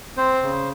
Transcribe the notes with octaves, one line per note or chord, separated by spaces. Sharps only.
C4 C5
C#3